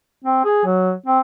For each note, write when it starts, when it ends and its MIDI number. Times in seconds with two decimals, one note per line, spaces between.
0.24 0.45 60
0.45 0.64 68
0.65 0.92 54
1.07 1.20 60